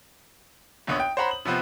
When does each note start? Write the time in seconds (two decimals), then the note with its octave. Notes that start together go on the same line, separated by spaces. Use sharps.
0.87 A#1 D3 B3 C#5 D#6
1.00 G5
1.17 C5 C#5 F#5 A#5 B5
1.31 F#7
1.45 C3 F3 B3 C4